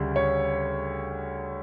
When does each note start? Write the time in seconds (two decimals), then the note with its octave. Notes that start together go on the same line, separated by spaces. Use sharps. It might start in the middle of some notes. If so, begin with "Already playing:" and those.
Already playing: D2 C#3 G3
0.16 C#5